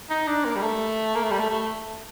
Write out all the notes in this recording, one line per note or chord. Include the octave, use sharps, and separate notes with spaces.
D#4
D4
A#3
G3
A3
A#3
A3
G3
A3
A3